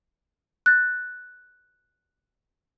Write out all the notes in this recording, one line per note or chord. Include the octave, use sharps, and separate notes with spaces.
F#6 A6